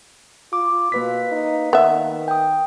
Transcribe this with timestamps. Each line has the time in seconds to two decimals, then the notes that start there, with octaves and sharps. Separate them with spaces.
0.53 F4 D6
0.92 B2 A#3 B4 B6
1.32 D#4
1.73 D#3 B3 E5
2.28 G5 D#6